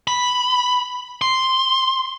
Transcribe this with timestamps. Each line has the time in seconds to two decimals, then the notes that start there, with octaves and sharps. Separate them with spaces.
0.08 B5
1.22 C6